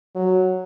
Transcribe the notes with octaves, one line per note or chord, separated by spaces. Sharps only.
F#3